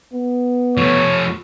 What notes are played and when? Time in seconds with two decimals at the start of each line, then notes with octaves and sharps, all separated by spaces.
0.13 B3
0.77 F3 A3 C#5